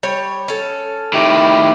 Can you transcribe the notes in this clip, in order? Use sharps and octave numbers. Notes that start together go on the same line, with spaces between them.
G3 C#5
C#4 A4
A2 D#3 A3 G4